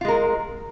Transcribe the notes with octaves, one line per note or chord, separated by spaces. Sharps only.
G#3 F4 A#4